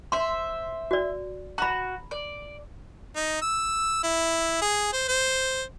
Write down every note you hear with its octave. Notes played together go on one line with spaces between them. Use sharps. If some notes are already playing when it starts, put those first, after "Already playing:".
C5 E5 C6
F#4 D5
F#4 A#5 B5
D5
D#4
E6
E4
G#4
C5
C5